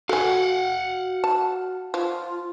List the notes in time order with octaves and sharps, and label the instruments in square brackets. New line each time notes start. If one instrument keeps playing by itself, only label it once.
[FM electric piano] F#4 [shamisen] A4 G#5 [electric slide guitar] F5 F#5
[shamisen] A5
[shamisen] F3 [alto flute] F4